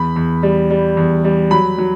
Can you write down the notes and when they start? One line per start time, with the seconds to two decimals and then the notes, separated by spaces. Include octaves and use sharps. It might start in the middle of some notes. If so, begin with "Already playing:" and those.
Already playing: E2 B5
0.16 E2
0.43 G3
0.70 G3
0.97 E2
1.24 G3
1.51 F#3 B5
1.78 F#3